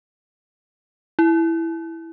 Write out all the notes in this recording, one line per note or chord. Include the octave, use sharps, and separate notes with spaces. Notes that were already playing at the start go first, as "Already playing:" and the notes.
E4